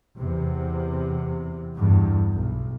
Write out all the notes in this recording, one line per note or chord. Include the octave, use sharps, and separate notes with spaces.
E2 C3
E2 G2
B1